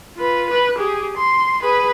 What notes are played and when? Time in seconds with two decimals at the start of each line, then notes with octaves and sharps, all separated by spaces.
0.16 F4 B4
0.50 B4 F#6
0.78 G4 G#4
1.17 C6
1.63 G#4 B4